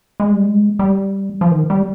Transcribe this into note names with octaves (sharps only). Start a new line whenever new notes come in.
G#3
G3
G#3
G3
F3
D#3
G3